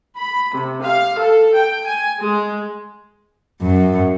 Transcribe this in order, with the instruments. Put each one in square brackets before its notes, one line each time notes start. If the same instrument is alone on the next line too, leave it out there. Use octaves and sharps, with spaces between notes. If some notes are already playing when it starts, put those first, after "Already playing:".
[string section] B5
C3
F5
A4
G5
G#5
G#3
[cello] F#2